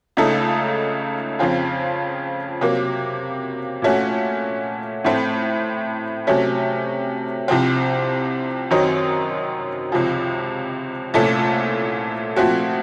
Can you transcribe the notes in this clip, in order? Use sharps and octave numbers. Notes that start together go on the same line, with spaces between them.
C#2 C#3 A3 D#4 A4
F2 C#3 F3 C4 F4
C3 F#3 A#3
A#2 A3 C#4 F#4
A2 A3 C4
C3 F#3 A3 C#4
C2 C3 F3 C4
F#2 D#3 F#3 C4 D#4
C#2 C3 F3
C2 A#2 A3 C#4 A4
A#2 F3 A3 C4 F#4